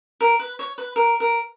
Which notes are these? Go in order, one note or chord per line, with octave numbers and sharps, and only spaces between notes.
A#4
B4
C#5
B4
A#4
A#4